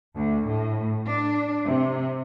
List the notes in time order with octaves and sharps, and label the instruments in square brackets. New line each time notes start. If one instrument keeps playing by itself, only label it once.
[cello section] D2
A2
D4
C3